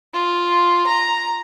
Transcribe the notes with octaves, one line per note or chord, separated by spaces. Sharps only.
F4
A#5